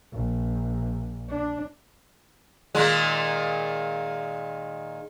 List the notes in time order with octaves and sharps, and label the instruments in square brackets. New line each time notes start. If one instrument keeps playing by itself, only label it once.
[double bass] A#1
D4
[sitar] A#2 D#3 G#3